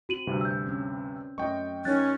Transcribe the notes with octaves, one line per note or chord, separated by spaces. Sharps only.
C4 F#4 D#7 F#7
D2 G2 C3
E6 G6
C4 C#4
F#2 F#3 A3 D#5 G5 C#6
F#3 C#4 D#4 A#4 F#6 A6